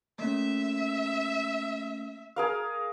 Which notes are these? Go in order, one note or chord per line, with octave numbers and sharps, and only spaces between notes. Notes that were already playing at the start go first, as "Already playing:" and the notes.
A3 A#3 C#4 E5
G#4 A#4 F5